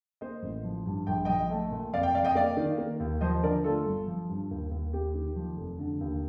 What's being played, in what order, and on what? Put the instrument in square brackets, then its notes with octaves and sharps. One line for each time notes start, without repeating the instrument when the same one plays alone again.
[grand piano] A#3 C5 D#5
A1
F3
G2
A#1 G5
A#1 D#5 G5
A3
A#2
F2 D5 F5
G5
F2 D5 F5
D#5 G5
A#3 D5 F5
D#3
A#3
D#2
F3 C5 D#5
D3 A#4 D5
A3 F4 A4
G1
F3
G2
D#2
D#2
A#3 G4
D#3
F3
F1
D3
D#2